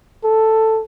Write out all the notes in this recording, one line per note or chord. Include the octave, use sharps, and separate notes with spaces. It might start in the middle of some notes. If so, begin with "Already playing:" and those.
A4